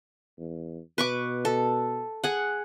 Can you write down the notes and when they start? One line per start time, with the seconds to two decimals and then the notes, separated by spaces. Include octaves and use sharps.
0.38 E2
0.98 B2 B4 C#6 D6
1.45 A4
2.24 G#4 F#5